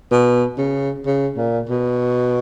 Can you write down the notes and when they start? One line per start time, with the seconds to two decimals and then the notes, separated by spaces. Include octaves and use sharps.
0.11 B2
0.57 C#3
1.06 C#3
1.37 A#2
1.69 B2